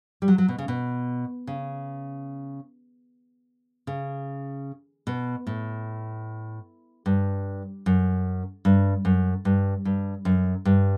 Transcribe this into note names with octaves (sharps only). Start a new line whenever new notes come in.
G3
F#3
F#3
B2
C#3
B2
C#3
C#3
B2
A2
G2
F#2
G2
F#2
G2
G2
F#2
G2